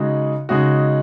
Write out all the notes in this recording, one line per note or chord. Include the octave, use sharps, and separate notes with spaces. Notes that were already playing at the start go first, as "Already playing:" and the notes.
Already playing: C#3 G#3 D#4 F#4
C#3 G#3 D#4 F#4